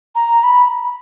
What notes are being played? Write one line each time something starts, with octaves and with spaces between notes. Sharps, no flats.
A#5
B5